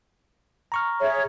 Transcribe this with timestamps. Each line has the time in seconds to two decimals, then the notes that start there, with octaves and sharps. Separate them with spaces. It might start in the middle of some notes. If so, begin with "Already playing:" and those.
0.72 A#5 C#6 F6
1.01 G#4 C#5 E5